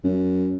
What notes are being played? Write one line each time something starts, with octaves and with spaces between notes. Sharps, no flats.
F#2